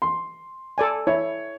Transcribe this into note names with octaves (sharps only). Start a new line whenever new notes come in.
C6
A4 D5 G#5
E4 C#5